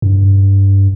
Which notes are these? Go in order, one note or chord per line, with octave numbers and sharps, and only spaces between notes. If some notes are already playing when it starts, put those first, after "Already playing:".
F#2
G2